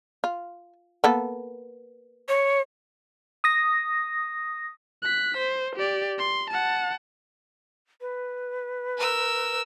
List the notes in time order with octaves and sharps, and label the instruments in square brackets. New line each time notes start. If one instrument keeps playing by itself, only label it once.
[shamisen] F4
A#3 B3 A4
[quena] C#5
[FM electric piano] D#6 A#6
[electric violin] F#6 B6
C5
G4 D5
C6
F#5 A5
[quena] B4
[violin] A#4 E6